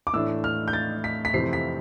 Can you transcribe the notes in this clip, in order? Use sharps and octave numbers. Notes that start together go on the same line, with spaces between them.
D6
A2 E3 A3 D4 E6
F6
G6
A6
B6
B6
F2 C3 E3 A3 C4 C7
B6